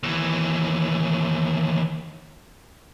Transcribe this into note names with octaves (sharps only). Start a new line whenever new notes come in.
D#2 E3